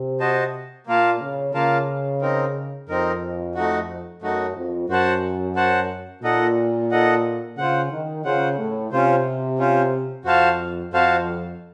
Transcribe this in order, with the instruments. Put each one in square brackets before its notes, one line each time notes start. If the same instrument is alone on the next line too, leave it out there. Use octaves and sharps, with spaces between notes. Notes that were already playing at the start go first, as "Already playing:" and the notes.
Already playing: [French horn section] C3
[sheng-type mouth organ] F#4 C5 D#5 A5
[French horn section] A#2 [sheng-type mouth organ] A#3 F4 A#4 F5 A5
[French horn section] C#3
[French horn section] C#3 [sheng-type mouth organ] A#3 F4 A#4 F5 A5
[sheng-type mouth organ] C4 D#4 A#4
[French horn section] F2 [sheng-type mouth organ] C4 D#4 A#4
[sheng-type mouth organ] A3 D#4 F#4
[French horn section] F#2 [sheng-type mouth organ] A3 D#4 F#4
[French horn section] F2
[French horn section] F#2 [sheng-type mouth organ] F#4 C5 F#5 A5
[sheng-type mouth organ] F#4 C5 F#5 A5
[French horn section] A#2 [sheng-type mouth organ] D#4 A4 D#5 F#5
[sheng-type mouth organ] D#4 A4 D#5 F#5
[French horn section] C#3 [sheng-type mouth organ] F4 C5 F#5
[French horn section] D#3
[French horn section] C#3 [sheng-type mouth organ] F4 C5 F#5
[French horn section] A2
[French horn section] C3 [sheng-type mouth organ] C#4 F4 C5
[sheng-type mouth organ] C#4 F4 C5
[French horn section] F2 [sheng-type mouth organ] F#4 C5 F5 A5
[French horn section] F2 [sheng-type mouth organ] F#4 C5 F5 A5